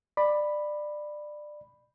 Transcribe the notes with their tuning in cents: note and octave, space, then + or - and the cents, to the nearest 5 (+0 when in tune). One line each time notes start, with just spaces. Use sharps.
D5 +20 B5 +0